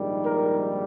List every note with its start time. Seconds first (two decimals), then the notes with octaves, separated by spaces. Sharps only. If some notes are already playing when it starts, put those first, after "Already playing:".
Already playing: A#1 G#2 D#3 G3
0.24 A#4